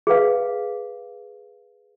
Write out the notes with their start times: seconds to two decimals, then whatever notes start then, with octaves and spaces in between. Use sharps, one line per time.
0.07 G#4 B4 F5